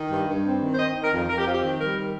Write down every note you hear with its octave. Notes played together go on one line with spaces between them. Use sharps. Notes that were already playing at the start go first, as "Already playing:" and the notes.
Already playing: D#3
G2
G2
C4
D#3
C5
C4 D#5
D#3
A#4
F2
F2 A#4
G4
C4 F4
G4
D#3
G3 A#4
D#3